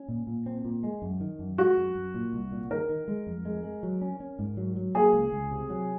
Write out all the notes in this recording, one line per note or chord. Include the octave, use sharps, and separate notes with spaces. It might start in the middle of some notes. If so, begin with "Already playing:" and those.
Already playing: C#4
A#2
A#2
C4
A#2
G#3
F#2
D#3
F#2
G#3 F#4
F#2
F#2
A#2
C2
A#2
D#3 A#4
D#3
G#3
F2
G#3
G#3
F#3
C#4
C#4
G#2
F#3
F#3
A#3 G#4
C#2
C#2
C3
F#3